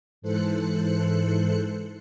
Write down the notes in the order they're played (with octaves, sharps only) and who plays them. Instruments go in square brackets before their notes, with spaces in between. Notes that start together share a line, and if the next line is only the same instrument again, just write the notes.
[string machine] G#2 E3 A4 C5 F#6 C#7